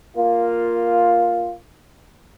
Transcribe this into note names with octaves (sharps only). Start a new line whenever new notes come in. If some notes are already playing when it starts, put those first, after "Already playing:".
A#3 F4